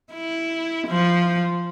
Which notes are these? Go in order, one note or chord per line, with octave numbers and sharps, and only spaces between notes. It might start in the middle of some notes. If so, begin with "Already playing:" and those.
E4
F3